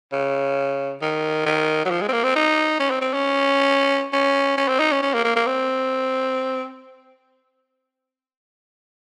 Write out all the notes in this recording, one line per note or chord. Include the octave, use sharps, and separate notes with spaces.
C#3
D#3
D#3
F#3
F3
G#3
C4
A#3
C4
D#4
C#4
C4
C4
C#4
C#4
C#4
C4
D#4
C#4
C#4
A#3
A#3
A#3
C4